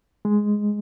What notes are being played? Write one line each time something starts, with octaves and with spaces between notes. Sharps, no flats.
G#3